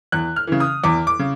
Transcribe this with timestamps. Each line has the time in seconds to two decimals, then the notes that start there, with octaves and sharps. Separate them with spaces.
0.12 E2 F#6
0.36 F6
0.47 C#3 E3
0.60 D#6
0.84 E2 D6
1.07 D6
1.19 C#3